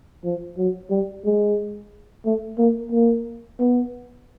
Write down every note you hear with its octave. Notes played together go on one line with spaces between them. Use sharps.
F3
F#3
G3
G#3
A3
A#3
A#3
B3